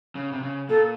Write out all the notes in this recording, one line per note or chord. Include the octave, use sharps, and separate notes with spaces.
C#3
C3
C#3
A#2 A4